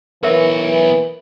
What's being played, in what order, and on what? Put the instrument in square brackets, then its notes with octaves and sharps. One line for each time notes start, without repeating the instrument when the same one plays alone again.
[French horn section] E3 [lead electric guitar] B3 C#5 [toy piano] A#4 E5